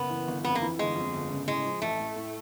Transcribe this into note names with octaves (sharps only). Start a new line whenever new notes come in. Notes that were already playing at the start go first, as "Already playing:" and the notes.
Already playing: F#1 B3
E3
G1
F2 B3
A#3
E3
G1 G#3
F2
G1
C#3
A2 G#3
F3
A1 A3
A2
A2